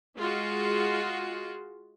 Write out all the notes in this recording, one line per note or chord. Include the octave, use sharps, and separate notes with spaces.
G#3 F4 F#4